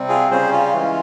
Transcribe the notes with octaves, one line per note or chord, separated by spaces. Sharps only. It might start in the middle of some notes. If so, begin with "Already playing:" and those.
Already playing: C3 G3 C4
F4 G#4
C#3 G3 C#4 G#4 C5
F4
E3 G#3 C#4